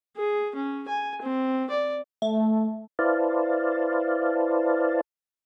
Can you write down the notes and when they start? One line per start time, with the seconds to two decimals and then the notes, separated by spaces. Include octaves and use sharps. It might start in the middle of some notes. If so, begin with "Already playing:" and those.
0.16 G#4
0.55 C#4
0.88 G#5
1.22 C4
1.70 D5
2.22 A3
2.99 E4 B4 C5 D5 F5 A5